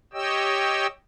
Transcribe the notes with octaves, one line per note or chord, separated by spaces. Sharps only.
G4 C#5 D#5 G5 E6